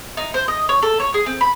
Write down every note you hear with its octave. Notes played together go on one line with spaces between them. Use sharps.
D#4
C5
D#5
C#5
A4
C#5
G#4
C4
B5